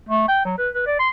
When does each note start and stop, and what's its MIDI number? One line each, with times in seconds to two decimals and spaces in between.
0.09 0.27 57
0.28 0.43 79
0.45 0.57 54
0.58 0.69 71
0.75 0.85 71
0.86 0.97 74
0.99 1.09 84